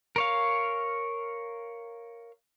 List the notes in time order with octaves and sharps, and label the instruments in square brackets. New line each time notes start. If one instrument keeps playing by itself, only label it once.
[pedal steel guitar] A#4 C#5 F5